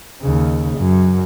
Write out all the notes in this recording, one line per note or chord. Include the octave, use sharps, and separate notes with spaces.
D#2 C#3
F#2